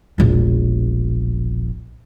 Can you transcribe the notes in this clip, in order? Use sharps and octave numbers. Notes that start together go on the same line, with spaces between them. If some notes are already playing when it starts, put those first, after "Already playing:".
E1 A#1